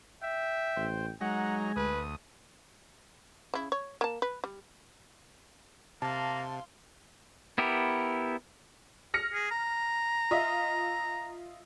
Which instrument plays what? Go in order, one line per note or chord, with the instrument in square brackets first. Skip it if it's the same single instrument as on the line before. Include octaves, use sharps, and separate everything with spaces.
[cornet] E5 [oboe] G5
[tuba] A1 [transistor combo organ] C5
[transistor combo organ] F#3 D#4 A#5 [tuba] G#3 [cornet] F#5 [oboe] G#5
[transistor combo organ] D2 D#6 [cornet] B4
[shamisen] C#3 E4
C#5
A#3 A5
B4
G3
[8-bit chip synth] C3 [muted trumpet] A#3 [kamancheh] F5 C6 [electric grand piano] A5
[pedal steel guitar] B3 E4 G4 A#4
[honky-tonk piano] F6 A#6 C#7
[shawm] G#4
A#5
[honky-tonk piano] F4 D#5 E5